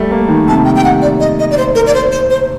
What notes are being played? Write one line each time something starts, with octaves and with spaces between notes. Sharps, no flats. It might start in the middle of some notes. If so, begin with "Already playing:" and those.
Already playing: G3 A3
A#3
D#3
C3 A5
G5
G5
F#5
D5
D#5
D#5
D5
C5
A#4
D5
C5
C5
C5